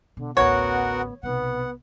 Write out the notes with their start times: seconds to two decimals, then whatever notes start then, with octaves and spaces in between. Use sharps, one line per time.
0.17 B2 D3
0.37 A1 D2 B3 F#4 A#4 C#5 F#5
1.23 B1 C3 B3 F#5